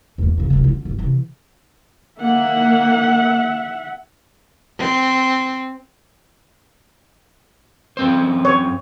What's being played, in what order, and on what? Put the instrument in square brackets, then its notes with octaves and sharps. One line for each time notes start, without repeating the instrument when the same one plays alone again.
[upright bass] E2 A#3
C#3 C4
F#1 C2
D3 F4
G1
C3 E3
[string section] A#3 [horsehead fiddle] E5 F#5
[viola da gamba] C4
[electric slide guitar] F#2 C4 C5
[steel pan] C#5